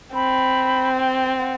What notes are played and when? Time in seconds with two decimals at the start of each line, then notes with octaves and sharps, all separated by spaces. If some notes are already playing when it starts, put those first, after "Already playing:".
0.13 C4 B5
0.96 G5
1.38 F#5